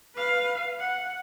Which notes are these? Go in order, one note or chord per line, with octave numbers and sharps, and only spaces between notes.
B4 F5
F#5